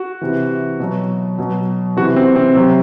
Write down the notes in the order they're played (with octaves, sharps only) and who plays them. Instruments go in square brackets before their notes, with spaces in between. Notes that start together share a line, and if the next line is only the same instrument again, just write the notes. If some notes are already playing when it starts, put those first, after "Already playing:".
Already playing: [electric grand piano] F#4
C3 E3
B2 F#3
B2 F#3
C3 E3 F#4
C4
C4
C3 F#3